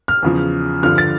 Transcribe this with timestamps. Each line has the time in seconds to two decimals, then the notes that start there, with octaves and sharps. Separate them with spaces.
0.08 F6
0.22 E2 C#3 F3
0.83 G2 D3 F3 F6
0.98 A6